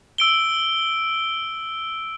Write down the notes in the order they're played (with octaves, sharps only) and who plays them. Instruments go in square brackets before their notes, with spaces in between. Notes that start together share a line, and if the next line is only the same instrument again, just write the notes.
[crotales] E6 D7 G7